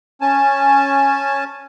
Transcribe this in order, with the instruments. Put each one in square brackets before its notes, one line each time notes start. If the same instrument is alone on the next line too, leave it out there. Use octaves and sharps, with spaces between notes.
[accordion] C#4 G#5 A5